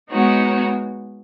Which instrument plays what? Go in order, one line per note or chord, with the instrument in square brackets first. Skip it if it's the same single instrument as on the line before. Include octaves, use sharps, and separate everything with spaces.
[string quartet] G#3 B3 D#4 F#4 C#5